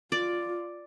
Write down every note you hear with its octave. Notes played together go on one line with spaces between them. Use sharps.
F4 D5